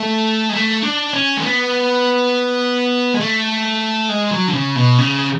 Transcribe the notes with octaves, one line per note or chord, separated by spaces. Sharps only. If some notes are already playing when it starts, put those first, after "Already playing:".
Already playing: A3
G#3
A3
D4
C#4
A3
B3
G#3
A3
G#3
F#3
D3
C#3
B2
C#3